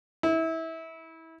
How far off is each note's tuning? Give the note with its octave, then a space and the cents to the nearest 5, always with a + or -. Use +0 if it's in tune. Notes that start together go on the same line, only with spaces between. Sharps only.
E4 -25